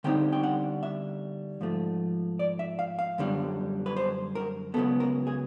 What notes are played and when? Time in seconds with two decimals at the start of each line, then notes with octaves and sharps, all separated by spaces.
0.04 D3 G3 C4 D#4 G5
0.32 G5
0.43 F#5
0.83 E5
1.61 G#2 F3 A3
2.39 D5
2.59 E5
2.79 F5
2.99 F5
3.18 F#2 D3 G3
3.86 B4
3.96 C5
4.35 A#4
4.74 C#2 C#3 F#3 B3 A4
5.00 A#4
5.27 G#4